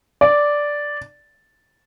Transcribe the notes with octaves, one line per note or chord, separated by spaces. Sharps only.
D5